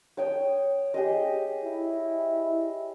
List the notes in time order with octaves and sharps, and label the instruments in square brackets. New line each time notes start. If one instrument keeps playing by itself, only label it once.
[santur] C#5 G5 D#6
G4 G#4 D#5
[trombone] E4